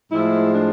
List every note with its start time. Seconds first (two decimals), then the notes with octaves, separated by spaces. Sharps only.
0.12 A2 F3 G#3 E4
0.53 D4